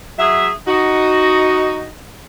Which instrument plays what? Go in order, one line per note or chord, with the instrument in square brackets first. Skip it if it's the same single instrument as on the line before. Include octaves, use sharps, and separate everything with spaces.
[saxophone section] F#3 G#4 E5
D#4 F#4